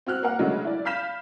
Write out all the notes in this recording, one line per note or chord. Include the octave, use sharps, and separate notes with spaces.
C4 F#4 F6 F#6
A#3 A#4 F#5
C#3 F#3 G#3 A3 D4
E4 D5
F5 B5 F6 G6 B6 E7